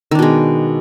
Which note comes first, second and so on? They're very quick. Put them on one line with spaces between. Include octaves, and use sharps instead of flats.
D#3 D4 B2 G#3